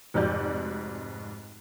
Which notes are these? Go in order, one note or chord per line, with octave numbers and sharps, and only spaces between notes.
F1 F2 G#2 F#4 D5 G6